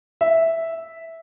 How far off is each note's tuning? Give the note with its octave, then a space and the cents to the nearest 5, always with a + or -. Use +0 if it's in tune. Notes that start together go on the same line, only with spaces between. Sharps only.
E5 -5